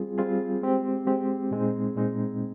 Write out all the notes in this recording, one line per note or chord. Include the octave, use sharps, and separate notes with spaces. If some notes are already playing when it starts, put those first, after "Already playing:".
Already playing: G3 C4 F4 G#4
G3 C4 F4 G#4
G#3 C4 G4
G#3 C4 G4
A#2 G#3 C4 D#4
A#2 G#3 C4 D#4